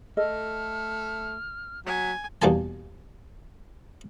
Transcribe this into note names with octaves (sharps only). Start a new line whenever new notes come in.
A3 A4 D#5 F6
F#3 G#5 B6
E2 B2 G3 A#3 G#5 A5